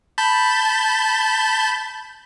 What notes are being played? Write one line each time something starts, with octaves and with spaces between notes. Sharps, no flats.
A5 B5 G6